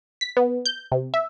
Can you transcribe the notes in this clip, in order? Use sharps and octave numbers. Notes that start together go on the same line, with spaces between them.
B6
B3
G6
C3
E5